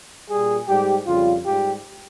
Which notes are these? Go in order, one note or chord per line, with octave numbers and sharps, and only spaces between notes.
A#2 G3 G#4
G#2 G3 G4
F2 C#3 G3 F4
G#2 G3 G4